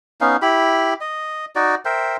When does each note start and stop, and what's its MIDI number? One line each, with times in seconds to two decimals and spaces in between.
0.21 0.37 59
0.21 0.37 61
0.21 0.37 63
0.21 0.37 77
0.42 0.94 64
0.42 0.94 67
0.42 0.94 83
1.01 1.46 75
1.55 1.75 63
1.55 1.75 66
1.55 1.75 74
1.85 2.17 70
1.85 2.17 72
1.85 2.17 76
1.85 2.17 79